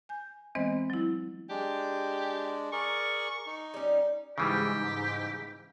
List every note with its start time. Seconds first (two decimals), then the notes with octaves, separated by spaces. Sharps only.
0.09 G#5 G6
0.55 E3 G#3 B3 C4 C5 D#5
0.90 F#3 E4
1.50 G#3 D4 G4
2.72 G#4 A#4 D5 C#6
3.47 D#4
3.74 G3 C#4
4.38 G#2 C#3 E3 G3 G4